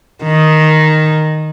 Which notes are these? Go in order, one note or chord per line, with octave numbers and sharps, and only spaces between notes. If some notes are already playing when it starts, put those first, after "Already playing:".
D#3